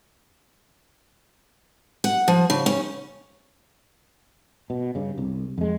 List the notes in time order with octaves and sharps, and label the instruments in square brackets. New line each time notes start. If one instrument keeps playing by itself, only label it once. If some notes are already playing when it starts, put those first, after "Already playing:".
[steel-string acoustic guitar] F#5
F3
C#3
C#4
[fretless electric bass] B2
G2 C#3
C2
F2 G#3